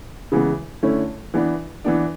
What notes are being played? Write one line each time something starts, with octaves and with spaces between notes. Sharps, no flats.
C#3 E3 G#3 B3
D3 A3 C#4 E4
E3 B3 D4
E3 B3 D4